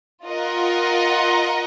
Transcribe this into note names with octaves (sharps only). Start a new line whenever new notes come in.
F4 A#4 D#5 F#5